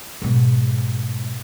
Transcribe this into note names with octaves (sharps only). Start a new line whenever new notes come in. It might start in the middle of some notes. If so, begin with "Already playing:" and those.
G#2 B2